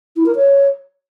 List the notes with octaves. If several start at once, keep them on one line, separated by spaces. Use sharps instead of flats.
E4
A#4
C#5